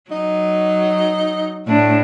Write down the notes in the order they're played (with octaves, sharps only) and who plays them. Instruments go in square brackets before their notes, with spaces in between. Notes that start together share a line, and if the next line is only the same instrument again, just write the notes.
[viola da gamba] F#3 [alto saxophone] D#4
[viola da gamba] A2 D4